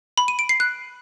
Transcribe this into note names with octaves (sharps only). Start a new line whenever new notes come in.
B5
D#7
D7
C7
F#6